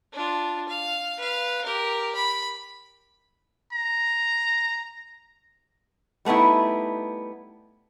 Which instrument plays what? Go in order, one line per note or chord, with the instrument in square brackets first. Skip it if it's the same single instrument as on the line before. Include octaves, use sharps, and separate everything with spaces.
[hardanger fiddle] D4 F4
F5
B4 F5
G4 A#4
B5
[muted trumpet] A#5
[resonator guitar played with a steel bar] G3 A3 B3 D#4 E4